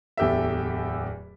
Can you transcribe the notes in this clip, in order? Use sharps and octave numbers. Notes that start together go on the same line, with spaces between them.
D1 E2 G4 A4 E5